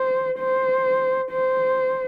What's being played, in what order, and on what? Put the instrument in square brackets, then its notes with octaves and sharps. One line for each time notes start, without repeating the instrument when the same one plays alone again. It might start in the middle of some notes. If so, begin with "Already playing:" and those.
Already playing: [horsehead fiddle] C5
C5
C5